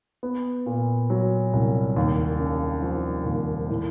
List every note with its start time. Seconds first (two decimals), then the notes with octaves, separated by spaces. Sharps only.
0.23 B3
0.66 A#2
1.10 F#3
1.53 C2
1.96 D#2
2.40 C#3
2.82 F3
3.26 D#2
3.69 A2